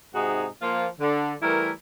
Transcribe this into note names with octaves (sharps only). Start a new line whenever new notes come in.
G#2 C3 D#4 F#4 G#4
F3 A#3 F4
D3
E3 G3 A3 E4 A#4